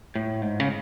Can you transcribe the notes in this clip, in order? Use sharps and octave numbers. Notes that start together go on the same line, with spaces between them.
A2
G#2
C#3